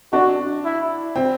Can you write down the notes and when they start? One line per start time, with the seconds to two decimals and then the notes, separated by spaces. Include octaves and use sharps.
0.13 D4 F#4
0.65 E4
1.16 C4